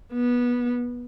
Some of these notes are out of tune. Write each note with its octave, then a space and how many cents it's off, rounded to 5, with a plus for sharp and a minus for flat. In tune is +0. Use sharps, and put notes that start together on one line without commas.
B3 -20